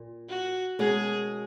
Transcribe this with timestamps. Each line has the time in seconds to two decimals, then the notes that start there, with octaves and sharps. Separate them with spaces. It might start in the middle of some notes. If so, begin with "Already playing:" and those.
Already playing: A#2
0.29 F#4
0.79 B2 G#3 C#4 F#4 G#4 A#4